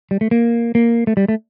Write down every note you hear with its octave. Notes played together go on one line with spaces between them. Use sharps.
G3
A3
A#3
A#3
A3
G3
A3